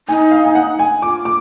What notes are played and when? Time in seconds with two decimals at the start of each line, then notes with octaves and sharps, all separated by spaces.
0.09 D#4 G#5
0.31 F5
0.45 G#5
0.55 F#5
0.79 G#5
1.02 F4 D6
1.25 D6